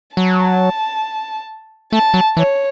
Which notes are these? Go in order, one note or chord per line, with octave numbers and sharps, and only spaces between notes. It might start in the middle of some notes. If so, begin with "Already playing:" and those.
F#3 A5
A3 A5
F#3
E3 C#5